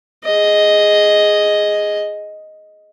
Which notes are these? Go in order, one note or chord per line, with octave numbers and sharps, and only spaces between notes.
G#4 D#5